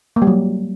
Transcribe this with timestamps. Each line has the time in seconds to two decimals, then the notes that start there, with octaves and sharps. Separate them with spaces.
0.16 A#3
0.22 G3
0.27 F#3